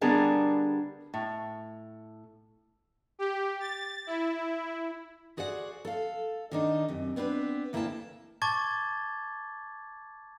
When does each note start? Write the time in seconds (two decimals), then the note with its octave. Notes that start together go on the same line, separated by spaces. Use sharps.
0.01 D3 G3 B3 D4 G#4 A#4
1.14 A2
3.19 G4
3.60 A6
4.07 E4
5.37 F#4 G#4 C5 D5 F#5
5.85 A4 F5
6.51 D#3 D4 D#4
6.88 F#2 C3
7.16 B3 C4 D4 A#4 B4
7.73 D2 A#3 E4 E5 G5 A5
8.42 A5 C#6 D6 G#6 A6 G7